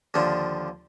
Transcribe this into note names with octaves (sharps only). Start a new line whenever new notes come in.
D#2 D3 F3 D4